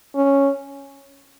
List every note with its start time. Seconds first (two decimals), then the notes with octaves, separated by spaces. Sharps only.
0.15 C#4